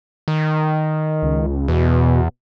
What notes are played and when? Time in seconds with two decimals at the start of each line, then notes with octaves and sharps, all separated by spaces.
0.28 D#3
1.23 C#2
1.68 E2 B2